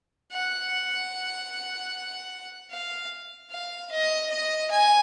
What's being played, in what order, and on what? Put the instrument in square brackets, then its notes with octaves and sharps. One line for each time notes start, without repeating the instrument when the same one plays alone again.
[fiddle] F#5
F5
F5
D#5
D#5
G#5